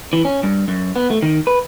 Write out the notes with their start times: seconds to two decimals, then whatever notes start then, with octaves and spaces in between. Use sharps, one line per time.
0.13 E3
0.25 C#4
0.43 G2
0.68 F#2
0.96 B3
1.10 A3
1.22 D#3
1.47 B4